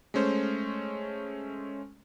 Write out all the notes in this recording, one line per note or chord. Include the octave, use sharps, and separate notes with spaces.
G#3 A3 C#4 C5